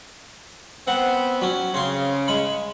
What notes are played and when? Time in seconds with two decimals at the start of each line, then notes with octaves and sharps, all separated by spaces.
0.88 B3 C4 F#5
1.41 F#3 C#4
1.74 C#3 C4 C6
2.28 G#3 B5